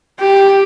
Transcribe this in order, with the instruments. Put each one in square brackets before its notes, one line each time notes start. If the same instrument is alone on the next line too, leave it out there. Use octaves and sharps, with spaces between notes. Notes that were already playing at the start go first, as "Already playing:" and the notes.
[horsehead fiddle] G4